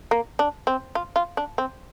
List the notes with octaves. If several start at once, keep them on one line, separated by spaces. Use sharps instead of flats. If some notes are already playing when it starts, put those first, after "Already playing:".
A#3
D4
C4
F4
F4
D4
C4